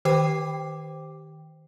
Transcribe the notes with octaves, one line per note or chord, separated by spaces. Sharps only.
D#3 G4 C5 G5 D6 C7